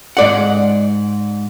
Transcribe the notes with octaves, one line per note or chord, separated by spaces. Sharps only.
G#2 D5 F#5